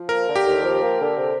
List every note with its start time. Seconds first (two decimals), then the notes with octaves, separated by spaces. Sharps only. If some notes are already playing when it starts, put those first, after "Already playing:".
Already playing: F3
0.09 A#3 A#4
0.27 D3
0.36 G4
0.45 D#2
0.63 F3
0.81 A#3
0.99 D3
1.16 C3